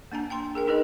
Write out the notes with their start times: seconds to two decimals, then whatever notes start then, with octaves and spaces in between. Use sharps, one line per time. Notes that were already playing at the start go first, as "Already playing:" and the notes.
0.12 A#3 D4 G#5 A#5
0.30 G5 A#5 C6
0.55 G#4 A#4 G5
0.67 D#4 G#4 A#4 B4 D#5